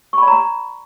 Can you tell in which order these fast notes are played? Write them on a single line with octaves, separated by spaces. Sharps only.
C#6 B5 D5 A#5